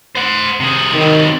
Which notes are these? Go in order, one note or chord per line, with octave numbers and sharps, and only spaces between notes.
C5 F#5
C3 G#4
C3 D#3 F#3